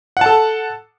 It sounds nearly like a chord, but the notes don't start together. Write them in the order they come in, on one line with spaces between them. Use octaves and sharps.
F#5 A5 A4